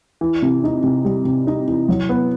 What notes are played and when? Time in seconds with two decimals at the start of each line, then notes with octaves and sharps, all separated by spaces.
0.21 E3
0.42 C3
0.64 D#4
0.83 C3
1.05 G3
1.25 C3
1.47 D#4
1.68 E3
1.89 F#3
2.09 B3